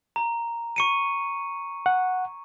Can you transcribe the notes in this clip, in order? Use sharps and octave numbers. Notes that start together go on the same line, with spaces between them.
A#5
C#6 C#7 D#7
F#5